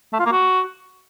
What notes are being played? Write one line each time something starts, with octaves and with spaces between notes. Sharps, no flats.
A3
F4
A#3
F#4